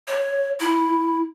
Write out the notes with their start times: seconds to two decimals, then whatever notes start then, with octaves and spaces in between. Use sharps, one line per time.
0.08 C#5
0.60 E4